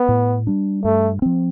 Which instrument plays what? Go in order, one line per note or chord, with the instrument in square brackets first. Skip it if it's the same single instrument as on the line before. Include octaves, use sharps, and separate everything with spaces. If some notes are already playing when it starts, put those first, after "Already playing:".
Already playing: [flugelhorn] B3
[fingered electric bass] A2
G3 D4
[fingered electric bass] G2 [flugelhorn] A3
[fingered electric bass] F3 C4